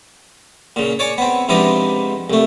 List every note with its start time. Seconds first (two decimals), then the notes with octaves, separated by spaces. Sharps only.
0.76 A#2 C#3
0.99 C#5 D5 G#5 C#6
1.18 B3 C4
1.49 G#2 C3 F3 B3 D4 D#4
2.30 C2 A3